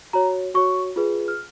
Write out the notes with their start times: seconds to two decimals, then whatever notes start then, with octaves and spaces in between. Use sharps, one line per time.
0.13 F#4 C#5 A#5
0.54 F#4 C#5 C#6
0.96 F4 G#4 B4
1.28 F6